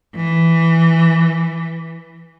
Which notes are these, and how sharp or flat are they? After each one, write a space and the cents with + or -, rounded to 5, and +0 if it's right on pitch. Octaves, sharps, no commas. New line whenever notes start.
E3 +0